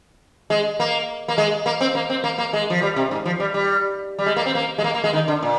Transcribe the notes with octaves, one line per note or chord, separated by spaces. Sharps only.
G#3
A#3
A#3
G#3
A#3
C4
A#3
C4
A#3
A#3
G#3
F3
G3
C3
G#2
F3
G3
G3
G3
G#3
A#3
C4
A#3
G#3
A#3
A#3
G#3
D#3
D3
A#2